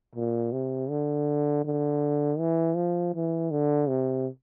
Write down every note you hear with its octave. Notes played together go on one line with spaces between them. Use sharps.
A#2
C3
D3
D3
E3
F3
E3
D3
C3